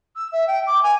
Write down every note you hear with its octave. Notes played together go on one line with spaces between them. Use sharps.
E6
E5
G5
D6
G#5